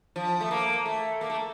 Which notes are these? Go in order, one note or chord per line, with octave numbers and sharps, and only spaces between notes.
F3
A3
A#3
A3
A#3
A3